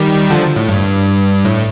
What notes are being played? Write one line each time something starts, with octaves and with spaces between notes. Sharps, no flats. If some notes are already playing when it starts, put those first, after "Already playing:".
Already playing: D#3 G3
D3 F3
A2
G2
A2